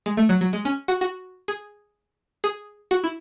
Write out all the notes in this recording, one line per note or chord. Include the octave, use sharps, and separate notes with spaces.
G#3
A3
F#3
F#3
G#3
C#4
F#4
F#4
G#4
G#4
F#4
E4